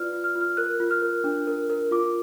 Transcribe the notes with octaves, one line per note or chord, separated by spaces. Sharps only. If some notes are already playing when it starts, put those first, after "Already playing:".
Already playing: F4 B4 D5 F6
F4
F6
F4
F6
A#4 F#6
F4
F6
A#4
D4
A#4
A#4
F4 D6